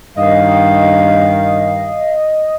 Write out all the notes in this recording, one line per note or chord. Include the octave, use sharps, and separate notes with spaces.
G2 D#3 D#5 F5